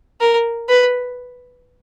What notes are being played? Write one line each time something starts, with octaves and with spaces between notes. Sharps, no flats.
A#4
B4